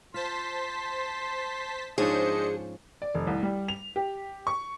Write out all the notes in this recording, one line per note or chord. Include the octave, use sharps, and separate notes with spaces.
F4 C5 A5 C6 B6
G#2 F3 C#4 D4 G#4 C5 D#5 C#7
D5
F1
C2
G3
F7
G4
C#6